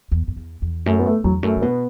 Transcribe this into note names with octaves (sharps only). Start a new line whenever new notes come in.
E2
F#2
E2
E2
F#2 A3
B3
A3
E2 F#3
F#2 A3
D3
B2 B3